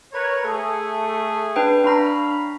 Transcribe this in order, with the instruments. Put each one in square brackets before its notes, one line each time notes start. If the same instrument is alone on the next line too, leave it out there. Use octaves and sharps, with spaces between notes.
[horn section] A#4 B4 C#5
A3 G#4
[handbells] D4 B4 G5
[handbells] D4 A#5 [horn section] C#5 F5 B5